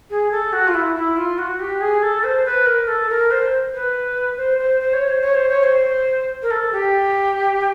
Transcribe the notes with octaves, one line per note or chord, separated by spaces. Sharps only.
G#4
A4
F#4
F4
E4
E4
F4
F#4
G4
G#4
A4
C5
B4
A#4
A4
A#4
C5
B4
C5
C5
C5
C#5
C5
C#5
C5
C#5
C5
A#4
A4
G4